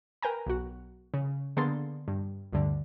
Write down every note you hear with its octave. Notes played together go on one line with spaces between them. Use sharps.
A#4 B4 G5 G#5 A#5
B1 F#4
C#3
D3 A#3 B3 G#4 C6 A6
G2
D2 G2 D3